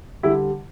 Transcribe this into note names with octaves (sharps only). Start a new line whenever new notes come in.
D3 G3 E4 G4